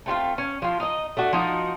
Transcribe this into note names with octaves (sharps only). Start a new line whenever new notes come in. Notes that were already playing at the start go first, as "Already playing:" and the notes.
A3 C4 D#4 F4
C#4
F3 F4
D#4 D#5
A3 D4 F#4
F3 D#4 F#4